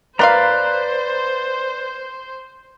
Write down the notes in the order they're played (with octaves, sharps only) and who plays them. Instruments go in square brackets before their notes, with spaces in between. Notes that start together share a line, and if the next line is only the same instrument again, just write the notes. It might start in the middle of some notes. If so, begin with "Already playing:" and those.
[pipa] A#3 F4 F5 [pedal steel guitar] B4 D5 A#5 [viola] C5